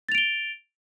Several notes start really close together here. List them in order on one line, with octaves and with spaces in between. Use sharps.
A6 F7 D7 G7